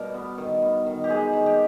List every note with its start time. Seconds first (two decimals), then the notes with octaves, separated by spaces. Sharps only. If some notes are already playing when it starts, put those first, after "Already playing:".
Already playing: B2 G3 A#4
0.14 B3
0.38 D#3
0.62 B3
0.86 D#3
1.04 G4
1.10 G#3 G#4
1.33 D#3
1.46 G4